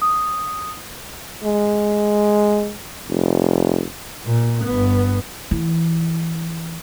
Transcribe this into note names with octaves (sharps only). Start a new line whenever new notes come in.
D#6
G#3
F1
A#2
G1 B3
E3